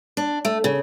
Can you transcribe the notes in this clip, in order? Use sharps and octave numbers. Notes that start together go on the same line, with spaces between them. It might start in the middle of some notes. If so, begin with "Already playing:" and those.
D4
A3
C#3